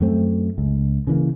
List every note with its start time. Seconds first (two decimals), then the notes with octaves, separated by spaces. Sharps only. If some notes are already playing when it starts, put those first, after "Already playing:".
0.01 F#2 A3 C4
0.58 C#2
1.07 C#3 E3 A#3